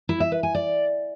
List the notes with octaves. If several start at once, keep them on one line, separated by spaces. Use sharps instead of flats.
E4
E5
B4
G#5
D5